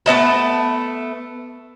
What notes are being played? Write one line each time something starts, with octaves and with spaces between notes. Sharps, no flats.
A3 B3 D#5 A5